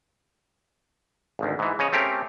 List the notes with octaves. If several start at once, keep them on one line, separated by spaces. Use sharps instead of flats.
G#1 D2
G#2 E3
C#3 C#5 D#5
A3 C4 C#4 G4 A#4